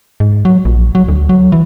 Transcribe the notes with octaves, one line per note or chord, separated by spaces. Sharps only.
G#2
F#3
A#1
F#3
D2
F#3
E3